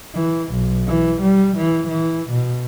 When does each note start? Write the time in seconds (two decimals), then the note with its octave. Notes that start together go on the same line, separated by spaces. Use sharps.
0.14 E3
0.52 B1
0.88 E3
1.22 G3
1.57 E3
1.88 E3
2.31 B2